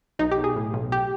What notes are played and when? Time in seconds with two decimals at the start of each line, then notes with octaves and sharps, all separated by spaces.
0.19 B1 D#4
0.31 G4
0.38 B1
0.44 G#4
0.56 A2
0.74 B1
0.92 G4